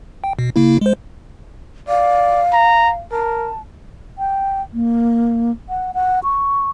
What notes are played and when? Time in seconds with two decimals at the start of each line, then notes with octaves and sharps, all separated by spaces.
0.24 G5
0.39 B2
0.56 C#3 A#3 E4
0.81 G#3 C5
1.89 D5 F5
2.53 A#5
3.12 A#4 A5
4.18 G5
4.73 A#3
5.69 F#5
5.94 F#5
6.24 C#6